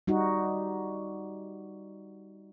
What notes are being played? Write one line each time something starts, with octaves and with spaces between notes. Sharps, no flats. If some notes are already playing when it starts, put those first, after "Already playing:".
G3 D#4 F#4